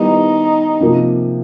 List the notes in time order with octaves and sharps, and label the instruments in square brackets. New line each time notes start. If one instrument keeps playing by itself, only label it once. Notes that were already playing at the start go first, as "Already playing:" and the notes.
Already playing: [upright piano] D#3 G3 B3 E4 G4 [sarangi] D#4
[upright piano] C3 F3 A#3